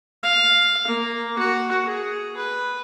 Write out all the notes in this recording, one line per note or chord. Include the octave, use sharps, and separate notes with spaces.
F5
A#3
F#4
G#4
B4